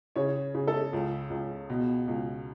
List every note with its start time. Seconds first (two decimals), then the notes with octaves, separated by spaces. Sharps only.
0.16 C#3 C#5
0.54 C#3
0.68 A4
0.93 C#2
1.30 C#2
1.70 B2
2.08 C#2